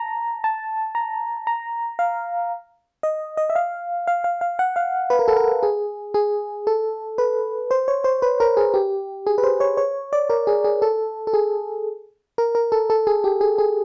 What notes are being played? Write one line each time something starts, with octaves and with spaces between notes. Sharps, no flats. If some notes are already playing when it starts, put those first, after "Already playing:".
Already playing: A5 A#5
A5
A#5
A#5
F5
D#5
D#5
E5
F5
F5
F5
F5
F#5
F5
B4
A#4
A4
A#4
G#4
G#4
A4
B4
C5
C#5
C5
B4
A#4
G#4
G4
G#4
B4
C5
C#5
C#5
D5
A#4
G#4
G#4
A4
A4
G#4
A#4
A#4
A4
A4
G#4
G4
G#4
G#4